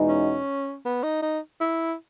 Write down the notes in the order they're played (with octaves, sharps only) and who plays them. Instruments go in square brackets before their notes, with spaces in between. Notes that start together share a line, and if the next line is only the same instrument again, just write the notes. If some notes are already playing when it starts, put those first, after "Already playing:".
Already playing: [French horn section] E2 B2 G#3 B3 D#4
[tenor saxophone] C#4
B3
D#4
D#4
E4